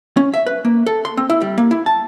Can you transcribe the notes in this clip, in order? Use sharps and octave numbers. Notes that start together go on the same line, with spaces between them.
C#4
E5
B4
A#3
A4
C6
C4
E4
G3
A#3
E4
A5